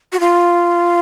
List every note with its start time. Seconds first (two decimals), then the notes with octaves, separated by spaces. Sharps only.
0.12 F#4
0.20 F4